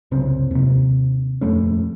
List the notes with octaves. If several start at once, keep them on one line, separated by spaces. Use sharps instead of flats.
F#1 C2 C#3 C4
D#2 C3
D#1 F2 A3 C#4